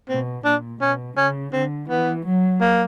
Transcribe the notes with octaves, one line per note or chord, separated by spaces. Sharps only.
B2 C4
A#2 D4
B2 C#4
C#3 C#4
D3 C4
E3 B3
F#3
A#3